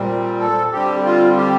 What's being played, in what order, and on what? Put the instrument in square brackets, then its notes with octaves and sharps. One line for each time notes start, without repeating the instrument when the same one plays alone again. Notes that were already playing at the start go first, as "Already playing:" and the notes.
Already playing: [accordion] A#2 G3 C4
A4
D3 G3 C4 G4
F4
G4